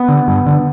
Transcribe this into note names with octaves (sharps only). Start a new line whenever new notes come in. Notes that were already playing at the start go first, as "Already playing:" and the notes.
Already playing: B3
D3
G2
D3